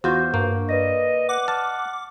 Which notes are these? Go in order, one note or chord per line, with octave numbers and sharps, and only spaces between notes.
E2 F4 F#4 C5 F#5 G6
G2 A#3 C#6
B4 D5 D#5 A#6
F#5 D6
A5 F6